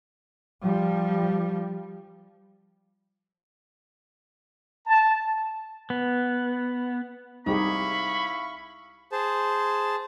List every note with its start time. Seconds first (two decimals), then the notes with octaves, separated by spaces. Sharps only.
0.63 F3 G3
4.86 A5
5.90 B3
7.46 C2 D#4 E4 G4 G#4 F5 B5 C#6
9.12 G#4 C5 A5